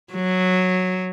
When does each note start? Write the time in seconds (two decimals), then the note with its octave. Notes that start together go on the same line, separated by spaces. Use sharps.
0.13 F#3